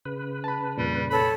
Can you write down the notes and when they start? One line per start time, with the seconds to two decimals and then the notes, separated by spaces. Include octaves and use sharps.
0.05 C#3 B4
0.44 A5 B5
0.78 F2 A#2 G3
1.10 A4 C#5 B5